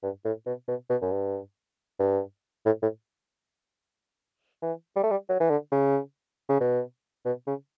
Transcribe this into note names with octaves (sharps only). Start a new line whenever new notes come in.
G2
A2
B2
B2
B2
F#2
G2
G2
A2
A2
E3
G3
A3
G3
F#3
E3
D3
C#3
C#3
B2
B2
C#3